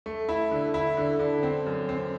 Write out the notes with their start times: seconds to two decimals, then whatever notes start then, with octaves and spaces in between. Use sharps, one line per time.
0.06 A3
0.29 E4
0.51 D3
0.74 E4
0.97 D3
1.19 D3
1.43 C4
1.66 F#2
1.89 C4